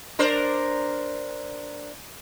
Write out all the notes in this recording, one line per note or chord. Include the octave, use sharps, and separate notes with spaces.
D4 A#4 C5